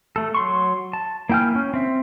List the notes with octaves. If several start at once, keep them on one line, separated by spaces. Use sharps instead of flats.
A3 A4
F#3 C6 C#6
A5
A#3 E4 G5 G#5 F6
C#4
C4 E5